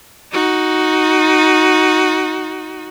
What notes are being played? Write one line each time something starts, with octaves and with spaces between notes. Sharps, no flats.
D#4 F#4